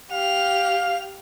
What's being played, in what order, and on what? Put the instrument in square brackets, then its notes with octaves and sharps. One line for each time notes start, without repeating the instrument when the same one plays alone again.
[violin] G4 F7 [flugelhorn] F5